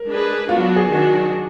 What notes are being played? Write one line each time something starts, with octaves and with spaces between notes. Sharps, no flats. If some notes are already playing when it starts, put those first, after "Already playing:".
Already playing: A#4
G#3 D4 G#4 B4
F#3 B3 D4 F4 F#4
G#4
D#3 F#3 D4 F#4